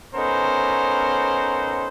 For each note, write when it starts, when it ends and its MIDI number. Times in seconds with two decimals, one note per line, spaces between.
0.15 1.88 59
0.15 1.88 61
0.15 1.88 63
0.15 1.88 69
0.15 1.88 70
0.15 1.88 72